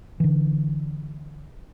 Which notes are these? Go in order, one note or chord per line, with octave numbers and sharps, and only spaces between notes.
D3 E3